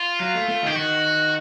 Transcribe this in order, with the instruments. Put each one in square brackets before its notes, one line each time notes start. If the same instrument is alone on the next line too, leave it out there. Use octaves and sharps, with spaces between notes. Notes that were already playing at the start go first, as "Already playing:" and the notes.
Already playing: [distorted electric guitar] F4
[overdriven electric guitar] F#3
A3
A3
[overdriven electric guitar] D#3 [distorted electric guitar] G4
[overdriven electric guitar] D#3 [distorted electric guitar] F#4